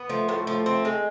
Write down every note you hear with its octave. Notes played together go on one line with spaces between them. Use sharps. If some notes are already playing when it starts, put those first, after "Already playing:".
Already playing: B3
F3 A3
A2
A3
F3
C4
G#3